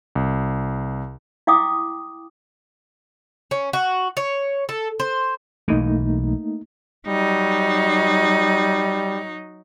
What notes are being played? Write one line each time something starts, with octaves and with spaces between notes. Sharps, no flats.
C2
E4 F5 G5 D6 D#6
C#4
F#4
C#5
A4
C5
B1 E3 A3 A#3 D#4
F#3 G3 D#4